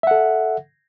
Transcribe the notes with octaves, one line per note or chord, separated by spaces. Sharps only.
A4 E5 F#5